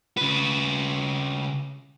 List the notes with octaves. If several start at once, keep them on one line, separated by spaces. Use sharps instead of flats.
C#3 B4